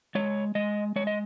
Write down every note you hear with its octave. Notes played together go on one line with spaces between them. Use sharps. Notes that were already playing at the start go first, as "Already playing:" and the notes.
G#3 C#5
G#3 D#5
G#3 C#5
D#5